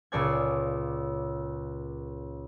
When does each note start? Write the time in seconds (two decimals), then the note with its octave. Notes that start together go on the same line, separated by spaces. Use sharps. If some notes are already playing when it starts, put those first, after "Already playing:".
0.12 C#2 A#2 C#5 D5 A5 G#6